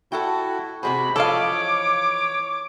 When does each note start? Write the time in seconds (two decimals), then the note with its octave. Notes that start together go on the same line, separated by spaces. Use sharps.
0.12 E4 F#4 A4 F#5 G5
0.83 C3 G#3 F#4 G#4 C5 B5
1.16 E3 F3 A4 C#5 D#5 F5 D6